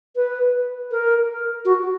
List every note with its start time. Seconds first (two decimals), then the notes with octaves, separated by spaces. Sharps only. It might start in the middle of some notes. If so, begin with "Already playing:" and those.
0.16 B4
0.91 A#4
1.65 F#4